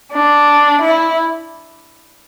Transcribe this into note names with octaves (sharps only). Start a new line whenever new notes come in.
D4
E4